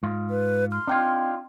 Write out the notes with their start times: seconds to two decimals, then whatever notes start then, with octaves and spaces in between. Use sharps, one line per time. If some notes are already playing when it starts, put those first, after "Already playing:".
0.03 G#2 F4
0.30 B4
0.72 C6 F6
0.88 C4 D4 D#4 F4 G5 G#6